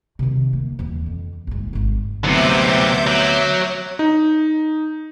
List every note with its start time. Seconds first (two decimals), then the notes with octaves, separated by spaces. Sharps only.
0.19 C3 D#3
0.53 A#3
0.79 D#2 E3
1.06 F2
1.47 A#1 G#2
1.73 G#1 G#2
2.24 D2 C3 F#3 B3 C4 E5 D6 G6
3.07 F#3
3.99 D#4